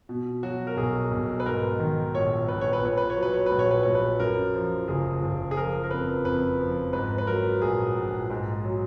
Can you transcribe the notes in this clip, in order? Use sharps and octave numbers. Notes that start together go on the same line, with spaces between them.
B2
F#3 F#4
A#4
B1 G#4
B1
B4
G#2 A#4
D#3
A#1 C#5
A#1 B4
C#5
B4
A#2 C#5
B4
C#5
F#3
B4
C#5
A#1 B4
C#5
B4
A#1 C#5
B4
F#2 A#4
F3
F#1 G#4
F#1
G#4
F3 A#4
A#4
F2 B4
F2 B4
F3
G#2 B4
B4
F#3 A#4
A#1 G#4
A#1
G#2
F#3